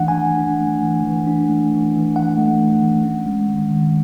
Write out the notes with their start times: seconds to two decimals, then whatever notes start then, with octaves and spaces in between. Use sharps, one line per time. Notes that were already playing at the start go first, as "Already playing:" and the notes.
Already playing: E3 A3 D4 F#5
0.08 G#5
0.16 E3
0.38 D4
0.61 A3
0.82 E3
1.04 E3
1.27 D4
1.49 A3
1.71 E3
1.93 E3
2.16 D4 F#5
2.37 A3
2.60 E3
2.82 E3
3.03 C#4
3.26 G#3
3.49 D#3
3.70 D#3